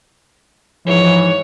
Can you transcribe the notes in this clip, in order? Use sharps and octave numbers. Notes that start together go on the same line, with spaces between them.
G#2 E3 F3 C#5